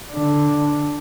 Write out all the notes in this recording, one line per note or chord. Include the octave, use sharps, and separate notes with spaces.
D3 D4